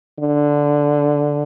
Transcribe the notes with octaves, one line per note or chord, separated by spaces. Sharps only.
D3